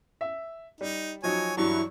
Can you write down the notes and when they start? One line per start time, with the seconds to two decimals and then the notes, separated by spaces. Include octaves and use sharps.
0.21 E5
0.81 G3 D#4
1.23 F3 F#3 D#4 C#5 G#5
1.57 G2 E3 F#3 E4 C#6